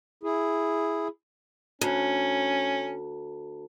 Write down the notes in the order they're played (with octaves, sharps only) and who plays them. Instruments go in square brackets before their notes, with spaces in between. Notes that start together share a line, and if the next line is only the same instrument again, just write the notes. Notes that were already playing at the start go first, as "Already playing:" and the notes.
[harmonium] E4 G#4
[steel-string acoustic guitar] D2 [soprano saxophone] C#4